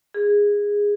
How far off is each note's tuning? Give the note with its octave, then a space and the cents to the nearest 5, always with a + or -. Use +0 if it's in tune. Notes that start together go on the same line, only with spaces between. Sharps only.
G#4 -15